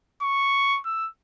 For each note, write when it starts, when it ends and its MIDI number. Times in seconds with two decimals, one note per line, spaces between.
0.22 0.79 85
0.85 1.08 88